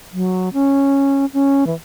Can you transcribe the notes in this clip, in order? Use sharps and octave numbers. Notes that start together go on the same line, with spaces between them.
F#3
C#4
C#4
E3